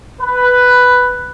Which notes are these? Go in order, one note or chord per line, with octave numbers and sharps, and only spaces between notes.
B4